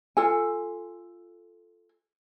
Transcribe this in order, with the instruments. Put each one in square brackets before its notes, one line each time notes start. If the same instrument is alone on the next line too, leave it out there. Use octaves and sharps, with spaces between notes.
[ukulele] F4 A4 G#5